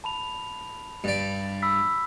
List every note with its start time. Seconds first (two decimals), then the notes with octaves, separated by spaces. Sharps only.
0.04 A5 B5 F7
1.04 G2 D5
1.62 B5 E6 B6